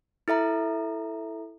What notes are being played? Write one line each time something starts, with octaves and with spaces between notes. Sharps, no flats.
E4 A4 E5 A#5